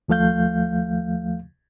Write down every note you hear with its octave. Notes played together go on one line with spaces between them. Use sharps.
D#2 F3 A3 F5 G6